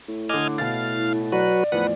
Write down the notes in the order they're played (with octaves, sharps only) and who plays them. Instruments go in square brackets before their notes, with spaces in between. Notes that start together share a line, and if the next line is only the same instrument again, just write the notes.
[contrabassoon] A2
[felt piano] D3 D6 [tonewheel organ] D#5 G#5 F6
[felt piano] B2 A6 [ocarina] E4 [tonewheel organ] F5
[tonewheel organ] F#3 F#4 B4 [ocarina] D5
[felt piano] E2 A2 F3 [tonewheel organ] B4 F#5